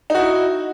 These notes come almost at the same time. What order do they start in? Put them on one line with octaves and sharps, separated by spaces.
D#4 F#4 E4